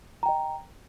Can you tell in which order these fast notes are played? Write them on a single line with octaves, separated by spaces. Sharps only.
A#5 G5 D#5